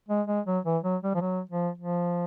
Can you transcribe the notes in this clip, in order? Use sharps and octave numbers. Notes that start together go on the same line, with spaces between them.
G#3
G#3
F#3
E3
F#3
G3
F3
F#3
F3
F3